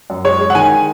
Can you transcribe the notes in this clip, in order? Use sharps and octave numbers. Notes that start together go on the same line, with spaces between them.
F#2
G#3 C#5
G#3
F#5
D#3 G#5